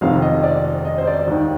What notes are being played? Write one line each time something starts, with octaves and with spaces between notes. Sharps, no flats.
F1 F2 C3 D#3 F5
D#5
D5
D#5
C5
D5
D#2 D#3